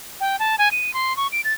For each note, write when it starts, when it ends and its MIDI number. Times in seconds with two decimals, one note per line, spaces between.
0.20 0.39 79
0.39 0.56 81
0.58 0.71 80
0.72 0.94 99
0.94 1.15 84
1.17 1.27 85
1.32 1.41 98
1.44 1.54 93